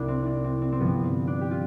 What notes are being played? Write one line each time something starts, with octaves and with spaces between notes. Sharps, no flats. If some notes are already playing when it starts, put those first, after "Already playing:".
Already playing: C2 D4 E4
C4
D4
C4
C4
C4
G2 D3 F3 B3
C4
D4
G4
F4